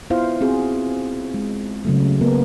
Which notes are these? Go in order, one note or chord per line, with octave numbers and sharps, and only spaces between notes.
B3 E4 F4 C5 F5
C4 F#4 G#4
G#3
C#3 F#3 A3
A#3 B3 A#4